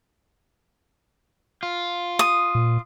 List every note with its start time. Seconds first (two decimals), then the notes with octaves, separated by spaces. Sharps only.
1.63 F4
2.19 D#6
2.55 A#2